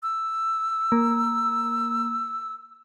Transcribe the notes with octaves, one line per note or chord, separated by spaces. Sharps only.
E6
A#3